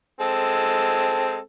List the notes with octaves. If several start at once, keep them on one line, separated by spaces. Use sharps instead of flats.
G#3 C4 A4